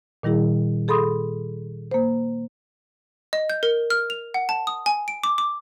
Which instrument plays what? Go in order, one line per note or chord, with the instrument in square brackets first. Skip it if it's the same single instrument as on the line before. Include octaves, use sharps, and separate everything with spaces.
[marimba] A#2 D#3 G3 E4 G#4
G#4 A4 B5 C6 D#6
A#3 C5
[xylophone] D#5
G6
A#4
F6
F7
F#5
A5
D#6
G#5
D7
D6
D6